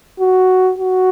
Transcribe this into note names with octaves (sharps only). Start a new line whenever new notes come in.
F#4
F#4